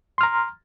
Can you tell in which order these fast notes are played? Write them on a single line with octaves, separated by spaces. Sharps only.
C6 F6 A#5